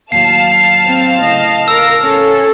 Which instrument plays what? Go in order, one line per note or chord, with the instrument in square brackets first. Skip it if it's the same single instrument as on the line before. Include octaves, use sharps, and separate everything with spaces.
[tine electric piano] D#2 A2 F#3 [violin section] F5 A5 [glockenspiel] C7
[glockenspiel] C7
[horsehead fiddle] C4
[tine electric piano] A2 C#3 [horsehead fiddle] D#5
[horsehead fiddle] A#4 [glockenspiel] E6
[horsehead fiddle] C#4 A4